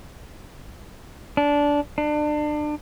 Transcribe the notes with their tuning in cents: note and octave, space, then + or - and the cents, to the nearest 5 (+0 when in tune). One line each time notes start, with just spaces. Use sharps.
D4 -15
D4 +30